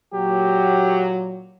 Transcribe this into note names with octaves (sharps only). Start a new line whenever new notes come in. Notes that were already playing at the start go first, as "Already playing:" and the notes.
A#2 F#3 G4